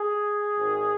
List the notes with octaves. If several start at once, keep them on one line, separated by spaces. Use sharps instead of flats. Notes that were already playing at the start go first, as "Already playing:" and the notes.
Already playing: G#4
G#1 G#2 D#3